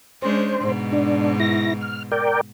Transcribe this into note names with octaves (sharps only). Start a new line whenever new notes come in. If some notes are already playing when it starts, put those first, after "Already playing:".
G#3 C#4 D4 C5
G#2 B2
D4
E4 A#6
F6
A#4 D5 G5